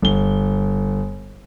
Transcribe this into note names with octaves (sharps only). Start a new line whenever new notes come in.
G1 G7